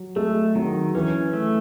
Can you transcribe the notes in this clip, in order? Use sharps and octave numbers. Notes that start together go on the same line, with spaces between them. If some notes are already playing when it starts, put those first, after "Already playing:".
Already playing: F#3
G#3 A3
D#3 F#3
E3 C#4
A3